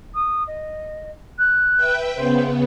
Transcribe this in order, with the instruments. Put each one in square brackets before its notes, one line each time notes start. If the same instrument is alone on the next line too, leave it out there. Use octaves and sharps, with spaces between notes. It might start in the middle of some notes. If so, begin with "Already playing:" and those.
[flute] D#6
D#5
F#6
[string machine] B4 E5 G5
[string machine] C#3 B3 [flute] C5